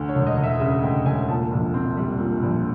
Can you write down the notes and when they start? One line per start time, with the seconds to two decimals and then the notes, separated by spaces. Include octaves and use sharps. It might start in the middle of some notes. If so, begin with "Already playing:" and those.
Already playing: D2
0.09 C#5
0.15 E1
0.27 D#5
0.37 E1
0.44 E5
0.60 C#3 E5
0.83 D2 G5
1.06 E1 G#5
1.28 A#2 A5
1.52 A#1
1.74 C4
1.97 G3
2.19 A#2
2.43 A#1